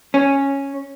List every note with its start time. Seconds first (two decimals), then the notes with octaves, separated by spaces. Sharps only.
0.14 C#4